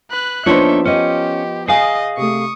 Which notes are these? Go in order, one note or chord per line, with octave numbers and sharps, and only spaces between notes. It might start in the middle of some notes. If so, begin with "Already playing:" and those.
B4 F#6
F3 A#3 B3 D4 D#4 C5 C#5 E5
C#4 F4 G4 D#5
G#4 D#5 F5 G#5
C3 A3 C#6 D#6